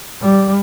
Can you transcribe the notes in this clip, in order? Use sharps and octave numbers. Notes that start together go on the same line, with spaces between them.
G3